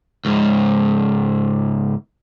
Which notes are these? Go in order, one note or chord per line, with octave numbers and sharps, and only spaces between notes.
C#2 G#2